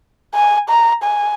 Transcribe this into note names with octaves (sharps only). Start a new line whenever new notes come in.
G#5
A#5
G#5